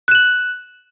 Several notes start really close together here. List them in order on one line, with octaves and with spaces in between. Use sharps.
F#6 E7 F#7